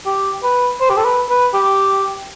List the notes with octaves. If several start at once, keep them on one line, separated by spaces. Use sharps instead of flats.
G4
B4
C5
G4
A4
B4
B4
G4